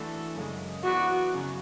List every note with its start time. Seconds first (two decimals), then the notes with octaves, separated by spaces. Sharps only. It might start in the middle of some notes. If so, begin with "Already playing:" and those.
Already playing: E3 A3 D4 F#4 A4
0.35 F#2 C#3 G#3
0.84 E3 B3 E4 F#4 B4 D5
1.32 F#2 C#3 F#3